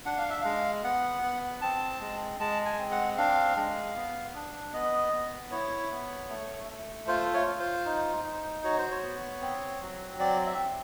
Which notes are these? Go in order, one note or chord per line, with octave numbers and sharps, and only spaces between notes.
D4 F#5
F5
E5
G#3 F5
B3 F#5
B3
C4 A5
G#3
G#3 A5
G#5
C4
F#5
D4 F5
G#3
B3
D4
B3 D#5
B3
E4 C#5
B3
A3
A3
F4 C5
C#5
F4
C5
D#4
D#4
F#4 C#5
C5
C#5
B3
C4
F#3
C4 D5
E5
C4